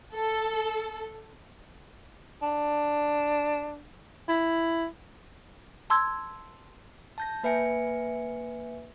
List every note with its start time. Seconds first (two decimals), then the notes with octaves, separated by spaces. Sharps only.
0.14 A4
2.42 D4
4.28 E4
5.90 A5 C6 E6 G#6
7.18 A5 G6 A#6
7.43 A#3 B4 E5 G#5 C#7